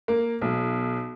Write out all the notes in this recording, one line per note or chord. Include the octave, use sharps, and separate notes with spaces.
A#3
B1